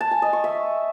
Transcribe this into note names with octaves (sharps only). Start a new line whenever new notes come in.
A5
G#5
D#5
C#6
E5